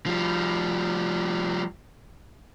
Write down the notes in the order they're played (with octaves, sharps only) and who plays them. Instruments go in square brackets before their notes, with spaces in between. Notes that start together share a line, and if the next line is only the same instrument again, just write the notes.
[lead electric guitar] F3 G3